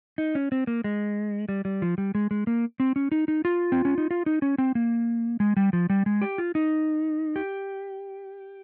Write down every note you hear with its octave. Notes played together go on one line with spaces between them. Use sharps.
D#4
C#4
C4
A#3
G#3
G3
G3
F3
G3
G#3
G#3
A#3
C4
C#4
D#4
D#4
F4
C4
C#4
D#4
F4
D#4
C#4
C4
A#3
G#3
G3
F3
G3
G#3
G4
F4
D#4
G4